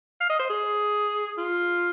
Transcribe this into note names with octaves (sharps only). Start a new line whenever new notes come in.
F5
D#5
C5
G#4
F4